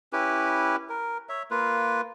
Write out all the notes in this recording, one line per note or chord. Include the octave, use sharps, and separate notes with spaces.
C#4 E4 G4 B4
A#4
C#5 E5
A#3 F4 B4